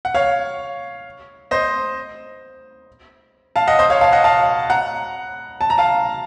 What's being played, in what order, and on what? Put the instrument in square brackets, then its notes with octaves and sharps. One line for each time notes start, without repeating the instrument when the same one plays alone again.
[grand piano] F#5
C#5 F5
C5 D#5
F5 A5
D#5 F#5
C5 D#5
C#5 F5
F5 A5
D#5 F#5
F5 A5
F#5 A#5
A5
A#5
F5 A5